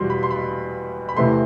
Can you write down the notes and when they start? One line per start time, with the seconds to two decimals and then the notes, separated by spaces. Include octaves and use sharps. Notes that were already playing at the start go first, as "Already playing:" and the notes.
Already playing: E2 B2 G3 C4 C6
0.10 B5
0.23 C6
0.31 B5
1.09 B5
1.16 E2 C3 E3 A3 C4 C6